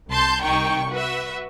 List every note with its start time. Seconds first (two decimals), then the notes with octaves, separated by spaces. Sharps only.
0.11 C2 A5 C6 G6
0.43 C2 D#3 G5 C#6
0.91 F#4 B4 E5